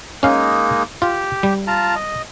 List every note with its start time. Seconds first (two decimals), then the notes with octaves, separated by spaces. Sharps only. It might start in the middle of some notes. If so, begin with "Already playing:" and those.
0.23 G#3 A#3 C#4 D#4 F5
1.02 F4 G4
1.43 G3
1.67 F4 A5 A#5
1.96 D#5